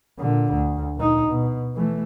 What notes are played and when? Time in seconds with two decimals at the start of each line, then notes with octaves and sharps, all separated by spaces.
0.19 A#2 D3
0.53 D2
0.96 A#2 D#4
1.29 B2
1.75 E3 A3